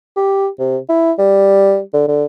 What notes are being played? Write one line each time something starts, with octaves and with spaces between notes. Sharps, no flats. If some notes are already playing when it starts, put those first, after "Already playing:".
G4
C3
E4
G3
D3
D3